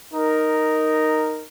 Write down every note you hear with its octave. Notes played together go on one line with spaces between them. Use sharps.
D#4 A#4